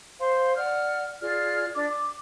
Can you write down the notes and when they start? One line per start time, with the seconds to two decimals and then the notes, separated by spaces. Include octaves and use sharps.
0.19 C5 F5 C6
0.57 D5 F#5 F6
1.21 F4 G#4 D5 F6
1.75 D4 D5 D6
1.88 D6